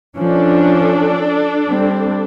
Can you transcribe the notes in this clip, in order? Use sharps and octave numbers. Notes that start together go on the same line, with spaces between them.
F3 C#4 D4 A4
G3 C4